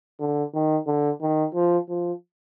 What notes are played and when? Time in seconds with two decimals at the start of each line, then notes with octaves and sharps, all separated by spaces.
0.20 D3
0.54 D#3
0.87 D3
1.21 D#3
1.54 F3
1.89 F3